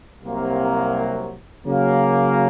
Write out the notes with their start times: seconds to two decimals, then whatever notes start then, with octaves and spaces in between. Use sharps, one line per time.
0.23 C2 C3 F#3 A#3
1.66 C#3 F#3 A#3